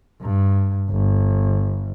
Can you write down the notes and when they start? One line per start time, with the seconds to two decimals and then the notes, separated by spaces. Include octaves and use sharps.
0.22 G2
0.90 G1